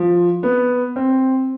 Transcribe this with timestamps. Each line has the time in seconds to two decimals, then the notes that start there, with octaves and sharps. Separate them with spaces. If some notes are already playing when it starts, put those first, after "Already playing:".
Already playing: F3
0.43 B3
0.96 C4